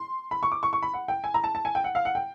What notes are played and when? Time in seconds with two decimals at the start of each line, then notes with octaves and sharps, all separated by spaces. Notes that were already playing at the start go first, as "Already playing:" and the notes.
Already playing: C6
0.31 B5
0.43 C#6
0.52 D6
0.63 C#6
0.73 C#6
0.82 B5
0.94 F#5
1.08 G5
1.24 G#5
1.34 A#5
1.44 A5
1.55 A5
1.65 G#5
1.75 G5
1.84 F#5
1.95 F5
2.05 F#5
2.15 G5